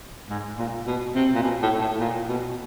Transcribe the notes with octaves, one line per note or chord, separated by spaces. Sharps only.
G#2
A#2
B2
C3
A#2
B2
A2
A2
A#2
B2